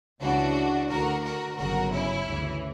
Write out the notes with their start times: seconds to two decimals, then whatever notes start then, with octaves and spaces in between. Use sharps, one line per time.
0.21 C#2 C#3 E3 D4 F#4
0.89 D2 D3 F#4 A#4
1.24 F#4 A#4
1.58 G1 F#2 C#3 F#4 A#4
1.92 C#4 E4
2.26 D2 C#3 E3